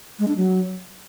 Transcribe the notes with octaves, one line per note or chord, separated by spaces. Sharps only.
G#3
D4
F#3